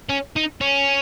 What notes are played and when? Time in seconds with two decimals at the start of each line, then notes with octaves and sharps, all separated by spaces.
0.09 C#4
0.36 D#4
0.61 C#4